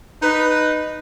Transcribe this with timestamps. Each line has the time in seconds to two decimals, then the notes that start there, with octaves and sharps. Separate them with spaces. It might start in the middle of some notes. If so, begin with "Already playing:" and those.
0.23 D#4 B4